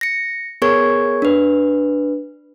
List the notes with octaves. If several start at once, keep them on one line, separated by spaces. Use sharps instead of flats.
A#6 C#7
B3 G#4 A#4 C#5 C#6 G#6
D4 B4